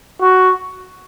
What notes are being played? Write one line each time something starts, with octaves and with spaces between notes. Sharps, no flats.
F#4